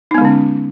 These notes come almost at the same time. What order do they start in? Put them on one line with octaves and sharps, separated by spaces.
D#4 B3 G#3 D3 C#4